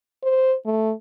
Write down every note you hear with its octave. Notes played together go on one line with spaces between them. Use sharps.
C5
A3